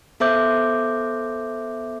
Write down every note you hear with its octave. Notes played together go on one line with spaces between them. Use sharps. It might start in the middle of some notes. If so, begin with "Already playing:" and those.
B3 A4 C5 E5 D6 G6